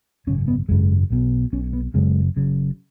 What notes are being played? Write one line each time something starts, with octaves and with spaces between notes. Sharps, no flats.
G#1 F#2 C#3 C#4
B3
G#1 F#2 C#3 G#3
B1 B2
B1 B2 C#4
B3
F#1 F#2 C#3 G#3
F#1 F#2 C#3